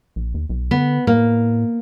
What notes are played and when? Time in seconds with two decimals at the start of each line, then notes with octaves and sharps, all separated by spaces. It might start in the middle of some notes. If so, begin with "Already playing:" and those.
0.16 A#1
0.34 D#2
0.49 B1
0.71 D3 B3
1.07 A2 A#3